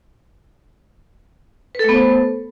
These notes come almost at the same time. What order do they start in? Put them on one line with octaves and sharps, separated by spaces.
B4 A4 A3 B3 C5